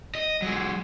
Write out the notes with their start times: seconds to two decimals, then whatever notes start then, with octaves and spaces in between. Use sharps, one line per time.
0.15 D#5
0.42 F#3 G#3